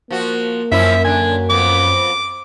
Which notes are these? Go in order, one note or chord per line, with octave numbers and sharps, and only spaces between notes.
F3 A#3 F#4
F#2 F3 C#4 E4 E5
D3 D4 G#5
F2 B3 D6